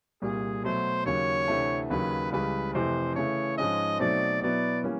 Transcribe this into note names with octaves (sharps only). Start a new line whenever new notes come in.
C2 A#2 G3 G#4
B2 F#3 A3 C5
D#2 C#3 F#3 C#5
D2 C3 E3 A3
D#2 C#3 F#3 B4
C#2 C#3 E3 G3 B4
F2 C3 E3 A3 C5
C#3 E3 A3 C#5
G#2 F3 G#3 C#4 D#5
B2 F#3 A3 C4 D#4 D5
B2 F#3 B3 E4 D5
E3 G3 A#3 C#4